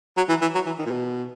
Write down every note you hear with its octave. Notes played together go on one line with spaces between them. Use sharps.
F#3
E3
E3
F#3
E3
D#3
A#2
B2